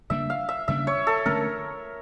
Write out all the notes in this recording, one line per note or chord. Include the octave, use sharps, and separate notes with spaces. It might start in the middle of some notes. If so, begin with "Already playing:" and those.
C#3 G3 A#3 D4 E5
F5
E5
C#3 G3 A#3 D4 E5
C#5
A4
D3 A3 C#4 A#4